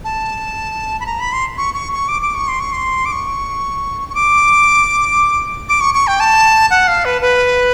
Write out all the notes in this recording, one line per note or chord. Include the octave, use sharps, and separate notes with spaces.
A5
B5
A#5
B5
C6
C#6
C#6
C#6
D6
D6
C#6
C6
C#6
C6
D6
C#6
C#6
D6
D6
C#6
C#6
G5
A5
F#5
F5
B4
B4